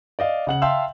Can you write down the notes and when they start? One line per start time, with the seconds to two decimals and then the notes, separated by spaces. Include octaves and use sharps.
0.19 D5 D#5 F5
0.47 C#3 F#5 F#7
0.62 E5 F5 G5 A5 C6 E6